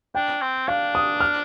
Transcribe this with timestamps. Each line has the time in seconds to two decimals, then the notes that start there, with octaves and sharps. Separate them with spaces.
0.15 D4 G5
0.42 C4
0.68 D4 F5
0.95 D#6
1.20 F6